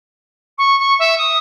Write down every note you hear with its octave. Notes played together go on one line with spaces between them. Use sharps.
C#6
C#6
E5
D#6